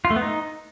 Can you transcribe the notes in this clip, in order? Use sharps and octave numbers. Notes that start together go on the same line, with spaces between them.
F4
A3
B3
D#4